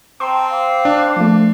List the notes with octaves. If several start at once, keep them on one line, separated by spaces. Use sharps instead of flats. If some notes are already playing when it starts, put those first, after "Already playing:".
C4 G5 A5 A#5 C6
F5 D6
D4
F3 A3